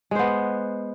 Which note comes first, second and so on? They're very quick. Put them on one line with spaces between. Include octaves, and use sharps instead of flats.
G#3 C5 B3